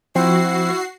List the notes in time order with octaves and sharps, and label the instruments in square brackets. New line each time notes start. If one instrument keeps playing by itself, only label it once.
[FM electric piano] F3 [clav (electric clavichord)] C4 [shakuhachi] E4 [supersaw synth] F#4 C7